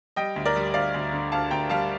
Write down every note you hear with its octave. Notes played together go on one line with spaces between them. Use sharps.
G3 D#5 G5
D2
A#4 D5
G3
D2 D5 F5
D2
D3
D2 F5 A5
D2 G5 A#5
G3 F5 A5